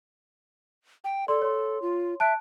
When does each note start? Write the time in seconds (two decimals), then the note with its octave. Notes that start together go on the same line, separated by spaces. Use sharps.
1.04 G5
1.28 A4 D5 C6
1.42 C#5 C6
1.82 F4
2.20 E5 A5 F#6 D7